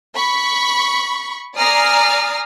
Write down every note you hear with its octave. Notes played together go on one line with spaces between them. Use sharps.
B5 C#6
D5 G#5 A#5 D#6 F6 C7